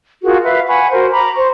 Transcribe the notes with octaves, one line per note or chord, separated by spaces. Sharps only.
F4 F#4 G#4 A#4
B4 E5 F5
F#5 G#5 B5 C#6
F#4 A#4 C5
A#5 B5 D6
C5 C#6